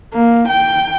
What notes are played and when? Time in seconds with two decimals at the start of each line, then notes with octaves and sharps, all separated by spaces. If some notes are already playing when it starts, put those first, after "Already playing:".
0.14 A#3
0.49 G5